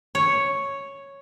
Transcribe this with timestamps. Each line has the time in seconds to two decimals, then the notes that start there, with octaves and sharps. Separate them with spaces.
0.15 C#5